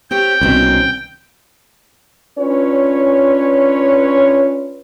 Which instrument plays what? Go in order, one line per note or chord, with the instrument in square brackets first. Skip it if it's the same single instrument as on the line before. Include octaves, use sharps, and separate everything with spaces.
[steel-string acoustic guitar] C4 G4 C#5 [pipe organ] G5
[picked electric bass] C2 B2 [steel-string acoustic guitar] D#3 C4 C#4
[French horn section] C#4 D4 F4 B4 C#5